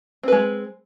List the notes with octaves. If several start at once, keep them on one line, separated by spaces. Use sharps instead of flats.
G#3 C4 B4